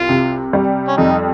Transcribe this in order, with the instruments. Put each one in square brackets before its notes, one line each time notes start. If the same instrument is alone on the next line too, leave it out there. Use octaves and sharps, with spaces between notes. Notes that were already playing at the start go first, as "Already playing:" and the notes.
Already playing: [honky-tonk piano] C2 [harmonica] F4
[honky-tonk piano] C3
G3
[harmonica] C#4
[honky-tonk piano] F2 [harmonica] D#4